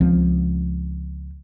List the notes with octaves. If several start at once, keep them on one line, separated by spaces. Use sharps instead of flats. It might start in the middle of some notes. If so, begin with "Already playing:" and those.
C#2 F3 C4